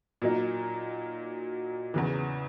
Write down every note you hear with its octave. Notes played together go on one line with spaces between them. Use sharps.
A#2 F#3 A#3 D#4
E2 C#3 E3